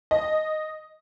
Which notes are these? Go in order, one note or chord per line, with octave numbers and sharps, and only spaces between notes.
D#5